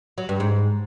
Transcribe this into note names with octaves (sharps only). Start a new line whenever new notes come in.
F#3
G2
G#2